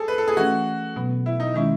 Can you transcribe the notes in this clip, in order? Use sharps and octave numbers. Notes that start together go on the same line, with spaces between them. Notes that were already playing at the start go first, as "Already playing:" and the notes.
Already playing: G#4 A4
B4
A4
G#4
E3 A3 C#4 F#4
B2 F#3 B3
E4
D#4
D#3 G#3 C#4 E4